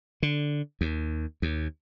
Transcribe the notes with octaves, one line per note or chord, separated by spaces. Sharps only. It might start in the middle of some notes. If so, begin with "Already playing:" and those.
D3
D#2
D#2